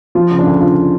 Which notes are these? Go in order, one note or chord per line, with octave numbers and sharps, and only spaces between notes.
F3 F4
C#3
D4
D2
D2 F4